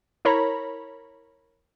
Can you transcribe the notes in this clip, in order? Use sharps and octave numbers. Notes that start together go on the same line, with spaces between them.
E4 A#4 C#5 A#5 B5